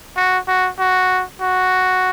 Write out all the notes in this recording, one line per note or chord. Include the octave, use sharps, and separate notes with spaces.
F#4
F#4
F#4
F#4